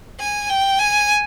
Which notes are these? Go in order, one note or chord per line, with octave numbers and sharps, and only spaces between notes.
G#5
G5
G#5